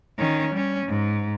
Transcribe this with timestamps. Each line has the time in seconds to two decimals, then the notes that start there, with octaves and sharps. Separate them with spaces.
0.18 D#3 C#4
0.54 G3 C#4
0.86 G#2